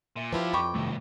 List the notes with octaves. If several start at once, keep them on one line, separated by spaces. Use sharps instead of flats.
A#2 E5 C6
F3 D4 E4 F4 G4 B4
F2 G5 B5 C#6 D6
B1 G2 C3 D#3 A3